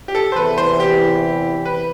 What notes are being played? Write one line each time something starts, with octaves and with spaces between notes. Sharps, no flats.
G4
A4
C5
E2 C3 E3 B4
C5
G4
B4